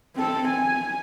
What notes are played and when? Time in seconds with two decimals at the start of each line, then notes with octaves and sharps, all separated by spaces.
0.16 C4 A4
0.48 G#5